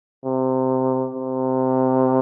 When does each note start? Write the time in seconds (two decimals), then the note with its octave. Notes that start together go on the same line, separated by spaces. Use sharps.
0.25 C3
1.14 C3